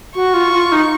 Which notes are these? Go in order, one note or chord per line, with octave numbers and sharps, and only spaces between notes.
F#4 C#6
F4
F4
D#4